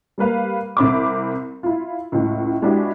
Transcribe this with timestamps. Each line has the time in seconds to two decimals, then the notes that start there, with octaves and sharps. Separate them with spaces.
0.18 G3 A#3 B4 F5
0.77 C2 C4 B5 D6
1.63 E4 F4
2.12 C#2 A2
2.62 G#3 B3 D4 E4 F#4 G4